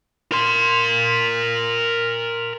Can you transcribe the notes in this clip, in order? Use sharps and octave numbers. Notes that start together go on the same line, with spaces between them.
A#4 C6